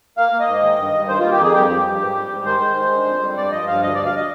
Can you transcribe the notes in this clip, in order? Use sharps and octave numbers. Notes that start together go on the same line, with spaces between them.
A#3 F5
A#3
D#5
G#2
D#3
G2
G2
D#3 C5
A#3 F4
G4
F2 G#4
G2 G4
F3
G2
G#2
G3
G#2
D#3 C5
G#3
G#3
D3
F2
G3
G2 D5
F3 D#5
G2 F5
D2 D#5
D2 D5
F5
D#5